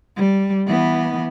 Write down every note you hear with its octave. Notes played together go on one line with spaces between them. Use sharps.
G3
E3 B3